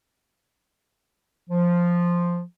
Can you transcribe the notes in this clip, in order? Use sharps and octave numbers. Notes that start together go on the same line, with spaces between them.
F3